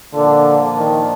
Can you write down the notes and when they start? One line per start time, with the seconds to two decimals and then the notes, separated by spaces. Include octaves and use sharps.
0.13 A#2 D3 F3 A#3 D4 F4
0.77 D#3